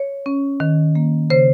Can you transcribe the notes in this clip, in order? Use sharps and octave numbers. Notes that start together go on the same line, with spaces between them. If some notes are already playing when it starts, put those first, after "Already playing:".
Already playing: C#5
C#4
D#3
A#3
C#3 C5